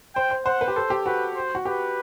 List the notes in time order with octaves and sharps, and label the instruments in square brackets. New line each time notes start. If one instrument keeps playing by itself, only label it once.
[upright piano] C5 [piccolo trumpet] G5
[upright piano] C5
[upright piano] C5 [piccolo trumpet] F#5
[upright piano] B4
G4
[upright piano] A4 [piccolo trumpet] C5
[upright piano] G4
[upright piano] F#4 [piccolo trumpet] B4
[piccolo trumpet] C5
[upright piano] F#4
[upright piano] G4 [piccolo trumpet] B4